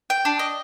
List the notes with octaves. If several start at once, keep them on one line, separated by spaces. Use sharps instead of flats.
G5
D4
D#5